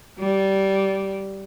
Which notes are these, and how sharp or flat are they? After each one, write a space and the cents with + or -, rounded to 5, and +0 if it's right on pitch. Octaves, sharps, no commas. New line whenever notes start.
G3 -15